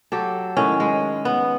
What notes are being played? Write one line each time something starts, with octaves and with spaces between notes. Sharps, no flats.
F#3 G4 A4
A2 D#3 C#4
G#3
B3